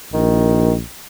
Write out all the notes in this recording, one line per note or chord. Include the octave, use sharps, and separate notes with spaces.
A#1 D#3